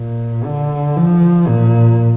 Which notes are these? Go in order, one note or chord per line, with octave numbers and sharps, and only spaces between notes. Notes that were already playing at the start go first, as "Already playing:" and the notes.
Already playing: A#2
D3
F3
A#2